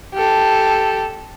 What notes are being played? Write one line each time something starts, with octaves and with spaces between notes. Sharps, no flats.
G4 A4